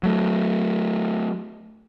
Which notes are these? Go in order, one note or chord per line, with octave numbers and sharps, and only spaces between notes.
F#3 A3